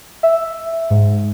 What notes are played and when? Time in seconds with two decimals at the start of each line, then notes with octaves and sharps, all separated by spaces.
0.23 E5
0.90 G#2